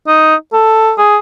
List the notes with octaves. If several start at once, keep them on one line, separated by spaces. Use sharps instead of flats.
D#4
A4
G#4